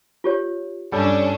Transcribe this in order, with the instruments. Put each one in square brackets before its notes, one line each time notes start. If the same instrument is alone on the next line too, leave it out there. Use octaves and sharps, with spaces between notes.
[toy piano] F4 G4 C#5
[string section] G2 C#4 D4 [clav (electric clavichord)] G3 A4 G5